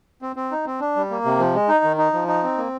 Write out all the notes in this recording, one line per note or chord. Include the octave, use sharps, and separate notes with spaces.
C4
C4
D#4
C4
D4
G3
A#3
C3
F3
G#3
D#4
D#3
D#4
F3
D#4
C4
A#3